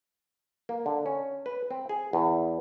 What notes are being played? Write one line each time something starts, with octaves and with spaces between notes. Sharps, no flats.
A#3
D3
C#4
B4
C4
G#4
E2